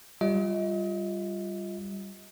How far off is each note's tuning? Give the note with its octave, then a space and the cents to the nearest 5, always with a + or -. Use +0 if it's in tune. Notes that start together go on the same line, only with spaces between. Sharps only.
G3 +0 F4 +0 D#5 +35